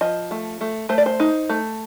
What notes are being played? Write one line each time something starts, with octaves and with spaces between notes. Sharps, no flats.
F3 D#5
A3
A3
A3 C5
D5
C5
D#4
A3